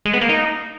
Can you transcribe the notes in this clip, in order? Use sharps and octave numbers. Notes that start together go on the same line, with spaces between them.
G#3
B3
A#3
D#4